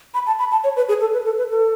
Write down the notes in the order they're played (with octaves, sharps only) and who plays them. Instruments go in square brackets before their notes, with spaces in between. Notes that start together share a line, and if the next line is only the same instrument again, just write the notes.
[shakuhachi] B5
A5
B5
A5
C#5
B4
G#4
A4
B4
A4
B4
A4